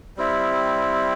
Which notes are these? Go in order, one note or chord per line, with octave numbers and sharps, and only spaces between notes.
G3 C4 E4